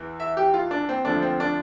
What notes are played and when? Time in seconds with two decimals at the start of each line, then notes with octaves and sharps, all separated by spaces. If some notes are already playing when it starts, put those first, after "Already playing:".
Already playing: E2 E3
0.20 E5
0.37 G4
0.54 F4
0.71 D4
0.89 C4
1.05 D2 D3 F3 D4
1.22 C4
1.40 D4